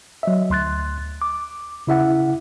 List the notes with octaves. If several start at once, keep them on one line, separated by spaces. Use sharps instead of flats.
F#3 D#5 E5
D2 C6 F#6 A6
D6
C#3 E4 E5 F#5